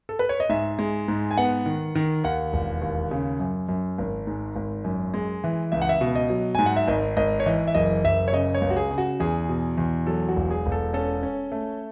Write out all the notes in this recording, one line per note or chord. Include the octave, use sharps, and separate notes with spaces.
A4
B4
C#5
D#5
G#2 E5
G#3
G#2
G#5
B3 F#5
D#3
D#3
D#2 F#5
E1
D#2
C#3
F#2
F#2
G#1
G#2
G#1
F#2
G#3
E3
C#2 E5
F#5
E5
B2
D#5
F#3
G#2 G#5
F#5
E5
G#1 D#5
G#1 D#5
C#5
E3 D#5
E5
F#1 D#5
F#1 E5
C#5
C#3 D#5
C#5
C#2
F#4
G#4
C#3
F#4
E2 G#4
B2
E2
F#3 A4
F#4
E1
G#4
E1
A4
C#4 A4
C#4
A3